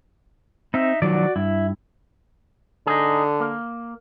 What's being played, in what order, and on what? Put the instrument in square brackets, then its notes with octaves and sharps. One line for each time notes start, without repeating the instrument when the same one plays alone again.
[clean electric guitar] C4 [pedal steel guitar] D#4 E5
[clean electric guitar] D#3 F3 F#3 [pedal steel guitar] F#4 D5
[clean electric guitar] G2 [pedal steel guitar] E4
[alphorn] D3 [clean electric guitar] D#4 G#4
[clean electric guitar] A#3